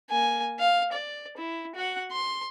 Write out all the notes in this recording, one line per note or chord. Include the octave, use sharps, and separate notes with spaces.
A#3 G#5
F5
D5
E4
F#4 F#5
C6